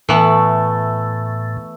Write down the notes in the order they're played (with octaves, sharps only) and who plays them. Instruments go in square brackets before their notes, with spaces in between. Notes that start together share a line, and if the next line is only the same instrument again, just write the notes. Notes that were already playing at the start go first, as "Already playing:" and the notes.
[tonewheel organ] A2 [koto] E3 B3 [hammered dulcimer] A3